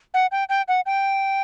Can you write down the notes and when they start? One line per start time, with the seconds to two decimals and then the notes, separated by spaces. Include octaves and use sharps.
0.14 F#5
0.32 G5
0.49 G5
0.68 F#5
0.86 G5